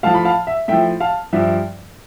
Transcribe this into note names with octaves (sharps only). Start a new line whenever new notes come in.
A2 F3 F5 A5
B5
F5 A5
E5
A2 F3 E5 G5
F5 A5
G2 F3 E5